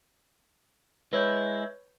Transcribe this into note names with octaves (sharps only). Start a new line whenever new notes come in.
G#3 E4 B4 C#5 G6